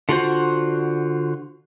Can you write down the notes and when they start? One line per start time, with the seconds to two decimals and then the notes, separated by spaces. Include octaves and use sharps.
0.09 D3 F4 F#4 C5